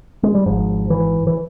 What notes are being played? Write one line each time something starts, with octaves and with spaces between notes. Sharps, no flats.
G#3
G3
G#1 G#2 F3
E3
E3